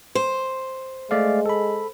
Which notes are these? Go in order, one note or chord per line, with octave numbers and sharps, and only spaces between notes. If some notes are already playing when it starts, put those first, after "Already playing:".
C5
G#3 A3 D5 F5
A4 B5